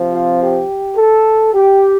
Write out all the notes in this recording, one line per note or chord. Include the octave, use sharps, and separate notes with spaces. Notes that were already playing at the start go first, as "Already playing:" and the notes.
Already playing: C3 F3 C4
F4
G4
A4
G4